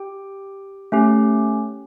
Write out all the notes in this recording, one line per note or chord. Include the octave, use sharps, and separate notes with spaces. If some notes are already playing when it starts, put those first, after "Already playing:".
Already playing: G4 G5
A3 C#4 G4